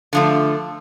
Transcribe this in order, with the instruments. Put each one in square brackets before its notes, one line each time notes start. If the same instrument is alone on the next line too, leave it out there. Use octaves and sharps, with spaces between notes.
[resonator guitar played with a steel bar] D3 F3 A3